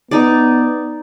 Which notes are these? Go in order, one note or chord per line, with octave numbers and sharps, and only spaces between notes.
B3 D#4 D5